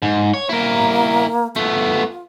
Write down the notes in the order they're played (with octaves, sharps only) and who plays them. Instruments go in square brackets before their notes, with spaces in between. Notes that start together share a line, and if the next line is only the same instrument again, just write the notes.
[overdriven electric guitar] G#2
C#5
[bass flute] A#3 [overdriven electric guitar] E4 A#4
[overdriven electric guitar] A3 B3 [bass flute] F4